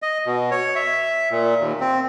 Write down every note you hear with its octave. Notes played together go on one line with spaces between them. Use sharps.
D#5
B2
C#5
E5
A#2
D#2
C4